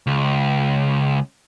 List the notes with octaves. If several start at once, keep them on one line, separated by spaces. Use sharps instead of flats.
C#2